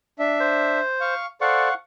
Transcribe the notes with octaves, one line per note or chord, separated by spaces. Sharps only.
D4 E5
C5
F5 C#6
A4 C5 D5 F5 F#5 C#6